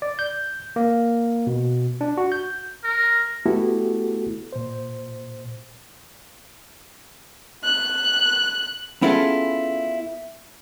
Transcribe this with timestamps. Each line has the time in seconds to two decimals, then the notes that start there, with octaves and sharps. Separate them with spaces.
0.02 D5
0.19 G6
0.76 A#3
1.47 B2
2.01 D4
2.17 F#4
2.32 G6
2.84 A#4
3.46 A3 B3 E4 F#4 G4 A4
4.52 A#2 C5
7.64 F#6
9.02 B3 C#4 E4 F4 G#4 A4